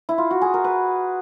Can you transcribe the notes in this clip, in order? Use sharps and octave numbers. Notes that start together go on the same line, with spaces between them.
E4
F4
F#4
G#4
A#4
B4